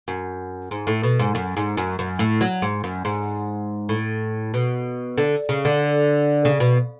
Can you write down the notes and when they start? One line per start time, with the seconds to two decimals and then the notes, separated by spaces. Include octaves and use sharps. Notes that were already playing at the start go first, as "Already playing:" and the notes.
0.08 F#2
0.71 G#2
0.87 A2
1.03 B2
1.20 G#2
1.35 F#2
1.57 G#2
1.77 F#2
1.99 F#2
2.19 A2
2.41 F#3
2.62 G#2
2.84 F#2
3.05 G#2
3.89 A2
4.54 B2
5.18 D3
5.49 C#3
5.65 D3
6.45 C#3
6.60 B2